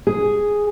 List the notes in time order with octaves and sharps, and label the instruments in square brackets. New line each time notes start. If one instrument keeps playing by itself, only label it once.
[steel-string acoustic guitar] G#4